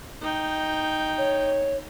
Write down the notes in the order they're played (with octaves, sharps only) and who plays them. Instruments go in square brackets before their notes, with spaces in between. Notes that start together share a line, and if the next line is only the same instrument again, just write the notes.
[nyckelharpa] D#4 G5
[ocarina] C#5